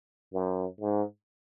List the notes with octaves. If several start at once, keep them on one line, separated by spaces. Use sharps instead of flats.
F#2
G#2